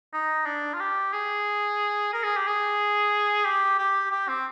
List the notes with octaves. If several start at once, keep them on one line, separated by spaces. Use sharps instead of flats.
D#4
D4
F4
G4
G#4
A#4
G#4
G4
G#4
G4
G4
G4
C4